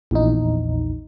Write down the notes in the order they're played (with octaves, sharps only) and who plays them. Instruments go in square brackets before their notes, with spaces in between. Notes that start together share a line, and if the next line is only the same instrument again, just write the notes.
[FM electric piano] A#1 E2 D#4